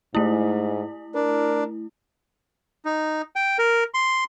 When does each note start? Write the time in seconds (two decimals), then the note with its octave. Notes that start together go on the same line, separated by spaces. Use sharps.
0.15 G#2 A3 E4
1.15 D4 A#4
2.85 D#4
3.36 G5
3.59 A#4
3.94 C6